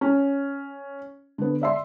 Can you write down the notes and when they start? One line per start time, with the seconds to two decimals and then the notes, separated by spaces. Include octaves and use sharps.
0.01 C#4
1.38 D3 B3
1.61 D5 E5 C6